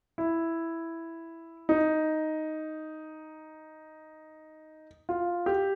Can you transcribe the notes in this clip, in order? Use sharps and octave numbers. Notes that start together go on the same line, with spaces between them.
E4
D#4
F4
G4